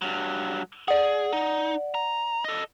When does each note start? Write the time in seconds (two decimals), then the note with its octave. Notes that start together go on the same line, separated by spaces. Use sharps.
0.02 G2 F#3
0.88 G#4 D5 F#5
1.33 D#4
1.95 A#5
2.44 A4 D#5